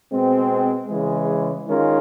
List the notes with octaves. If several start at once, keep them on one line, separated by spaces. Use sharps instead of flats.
B2 G#3 C4
C#3 E3 G#3
D#3 G#3 C#4 F4 A#4